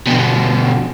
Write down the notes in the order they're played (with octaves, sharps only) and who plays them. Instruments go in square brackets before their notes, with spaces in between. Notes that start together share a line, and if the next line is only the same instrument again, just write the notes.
[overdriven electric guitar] B2 D3